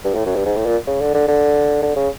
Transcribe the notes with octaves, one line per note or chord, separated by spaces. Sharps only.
G2
A2
F#2
G2
G#2
A2
A#2
C#3
D3
D3
D3
D3
C#3